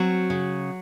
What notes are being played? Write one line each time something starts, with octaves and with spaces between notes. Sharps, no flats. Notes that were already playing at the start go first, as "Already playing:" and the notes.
Already playing: F#3 C4 F#4
C#3